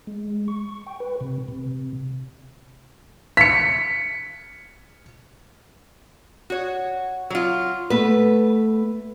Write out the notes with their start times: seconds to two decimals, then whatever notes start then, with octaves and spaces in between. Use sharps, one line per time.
0.07 G#3
0.48 C#6
0.87 G5
1.00 B4
1.21 C3
1.48 C3
3.37 B6 C#7
6.50 F#4 C#5
7.30 F#3 F4
7.90 A3 B3 B4